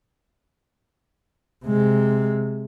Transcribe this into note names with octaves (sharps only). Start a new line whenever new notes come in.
C3 G#3